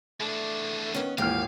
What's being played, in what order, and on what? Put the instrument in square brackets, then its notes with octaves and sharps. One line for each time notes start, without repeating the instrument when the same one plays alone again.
[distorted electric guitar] E2 D4 [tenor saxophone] A3
[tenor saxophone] D#3 [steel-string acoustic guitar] B3 C#4
[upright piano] D#1 E3 F6 [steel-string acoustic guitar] D#2 G#2 [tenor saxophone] G4 [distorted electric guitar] F5